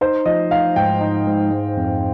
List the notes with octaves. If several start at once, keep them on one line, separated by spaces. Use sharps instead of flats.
D#4 C5
F3 D#5
D#4 F5
G#2 G5
D#4
G#2
G#3
F2